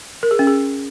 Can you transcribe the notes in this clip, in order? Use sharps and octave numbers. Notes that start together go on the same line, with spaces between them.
A#4
G#4
C#4
G#4